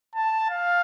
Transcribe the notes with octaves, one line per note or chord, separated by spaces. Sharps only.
A5
F5